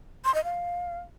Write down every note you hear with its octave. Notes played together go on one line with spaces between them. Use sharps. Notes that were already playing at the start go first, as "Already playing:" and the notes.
C6
D#5
F5